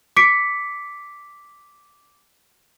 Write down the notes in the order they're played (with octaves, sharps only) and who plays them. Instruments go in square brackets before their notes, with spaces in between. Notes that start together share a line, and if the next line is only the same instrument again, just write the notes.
[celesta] D6 B6 C#7 D7